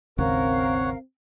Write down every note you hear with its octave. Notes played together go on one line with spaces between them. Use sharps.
G#1 D#2 C#3 C4 A#4 C#5 F5 F#5